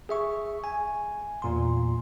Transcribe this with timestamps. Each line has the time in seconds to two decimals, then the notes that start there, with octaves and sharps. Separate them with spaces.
0.09 G#4 E5 C#6
0.64 G#5
1.42 E2 A#2 C6